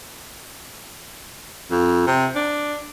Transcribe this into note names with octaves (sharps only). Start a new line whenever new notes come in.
F2
C3
D4